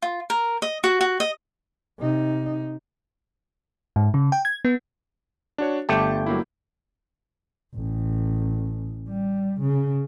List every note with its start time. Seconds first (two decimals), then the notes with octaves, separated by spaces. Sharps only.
0.02 F4
0.30 A#4
0.62 D#5
0.84 F#4
1.01 F#4
1.20 D#5
1.99 C3 D#4
3.96 G#2
4.14 C#3
4.32 G5
4.45 G#6
4.65 B3
5.58 D4 F#4 C#5
5.89 G1 A3 G4 A5 D6 G6
6.26 F#3 A#3 E4
7.74 A1
9.09 G3
9.61 C#3